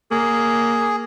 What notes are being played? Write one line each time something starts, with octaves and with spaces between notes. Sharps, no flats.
A#3 G#4